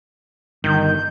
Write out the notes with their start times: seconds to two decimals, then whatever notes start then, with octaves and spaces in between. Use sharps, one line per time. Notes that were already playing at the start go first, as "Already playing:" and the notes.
0.64 G1 D#3 G6